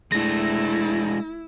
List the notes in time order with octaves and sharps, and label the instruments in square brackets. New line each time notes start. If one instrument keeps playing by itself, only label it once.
[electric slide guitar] G#3 D4 [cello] A3 [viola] E4 [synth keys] A#6